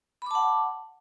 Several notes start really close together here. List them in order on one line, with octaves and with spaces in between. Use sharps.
B5 D6 A5 F#5